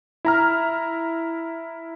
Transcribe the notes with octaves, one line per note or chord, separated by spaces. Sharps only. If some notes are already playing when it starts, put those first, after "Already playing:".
E4 A#5 F6